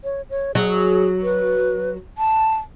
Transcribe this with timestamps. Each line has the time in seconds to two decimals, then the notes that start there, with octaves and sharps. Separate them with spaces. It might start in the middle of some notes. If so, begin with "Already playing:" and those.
0.04 C#5
0.30 C#5
0.55 F#3 G#4
1.22 B4
2.18 A5